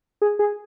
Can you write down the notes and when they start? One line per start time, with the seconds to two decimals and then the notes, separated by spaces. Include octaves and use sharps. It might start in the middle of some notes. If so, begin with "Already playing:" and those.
0.22 G#4
0.39 G#4